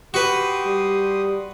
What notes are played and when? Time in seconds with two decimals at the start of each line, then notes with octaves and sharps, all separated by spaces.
0.14 F#4 G4 B4 C6 D#6
0.66 G3